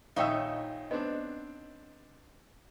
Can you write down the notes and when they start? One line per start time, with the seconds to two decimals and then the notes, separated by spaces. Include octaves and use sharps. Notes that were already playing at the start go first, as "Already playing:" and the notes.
0.16 A#1 D#3 D#4 C#5 E5 F5 G5
0.91 B3 C4 D4 D#5